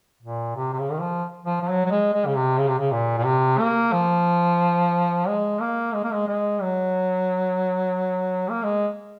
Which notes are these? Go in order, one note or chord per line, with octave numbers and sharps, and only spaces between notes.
A#2
C3
C3
C#3
D#3
F3
F3
F3
F#3
F#3
G#3
G#3
C#3
C3
C#3
C3
C#3
A#2
A#2
C3
A#3
F3
G#3
A#3
G#3
A#3
G#3
G#3
F#3
A#3
G#3